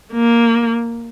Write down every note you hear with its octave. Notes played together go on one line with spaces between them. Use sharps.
A#3